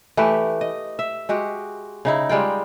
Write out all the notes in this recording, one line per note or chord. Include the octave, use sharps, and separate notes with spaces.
E3 A3 G4 B4
D#5
E5
G#3 F#4 G4
C#3 D#4 E4
G3 G#3 F4 G5